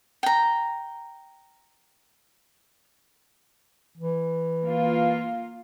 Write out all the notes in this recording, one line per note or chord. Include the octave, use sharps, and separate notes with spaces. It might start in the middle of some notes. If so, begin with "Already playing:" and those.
G5 A#5
E3
A#3 F4